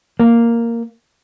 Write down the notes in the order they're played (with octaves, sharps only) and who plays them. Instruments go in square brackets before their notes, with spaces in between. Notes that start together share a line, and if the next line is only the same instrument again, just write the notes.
[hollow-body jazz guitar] A#3